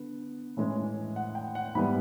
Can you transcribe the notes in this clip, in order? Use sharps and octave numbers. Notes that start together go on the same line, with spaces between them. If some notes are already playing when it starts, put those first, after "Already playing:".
Already playing: D3 B3
A2 E3 G#3 C#4
F#5
G5
F#5
G#2 E3 G3 B3 B5